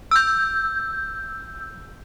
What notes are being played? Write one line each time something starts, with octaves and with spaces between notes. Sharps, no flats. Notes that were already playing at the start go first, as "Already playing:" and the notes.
E6 G6